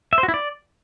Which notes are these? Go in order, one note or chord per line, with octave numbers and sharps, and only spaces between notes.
E5
C5
F#4
E4
D5